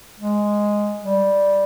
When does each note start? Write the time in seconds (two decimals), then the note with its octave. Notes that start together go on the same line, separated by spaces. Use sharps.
0.20 G#3
1.03 G3